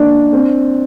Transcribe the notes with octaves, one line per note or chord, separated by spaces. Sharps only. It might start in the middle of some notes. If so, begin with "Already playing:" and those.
Already playing: A#3 D4
C4